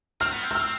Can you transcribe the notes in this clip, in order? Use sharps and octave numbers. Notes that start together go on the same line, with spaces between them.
C4 F6
B3
C4
E6
F6